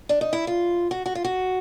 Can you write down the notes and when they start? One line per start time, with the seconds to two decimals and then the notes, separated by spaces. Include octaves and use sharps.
0.09 D4
0.21 D#4
0.33 E4
0.47 F4
0.91 F#4
1.06 F#4
1.15 F4
1.24 F#4